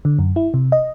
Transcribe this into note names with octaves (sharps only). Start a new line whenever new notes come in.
D3
F#2
E4
C3
D#5